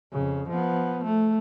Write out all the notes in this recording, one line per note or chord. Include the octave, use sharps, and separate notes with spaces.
F2 C#3
F3 B3
A3